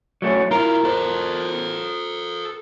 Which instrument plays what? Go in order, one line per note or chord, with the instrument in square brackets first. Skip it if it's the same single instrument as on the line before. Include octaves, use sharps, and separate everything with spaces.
[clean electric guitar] F#3 A3 C#4
[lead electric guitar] E4 F4 [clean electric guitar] A#4
[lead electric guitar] A4 C5